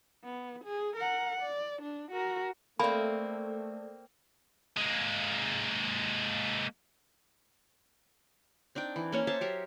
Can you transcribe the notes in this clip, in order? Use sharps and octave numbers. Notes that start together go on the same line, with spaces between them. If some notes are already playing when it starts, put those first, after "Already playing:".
B3
G#4
A#4 F#5
D5
D4
F#4 A#4
A3 A#3 C4 A4 D5 B5
G#3 A#3
C4 D4 D#4 G5
E3
A#3 C#4 C#5
C5 C#5 E5 A5
F#3 G4 A#4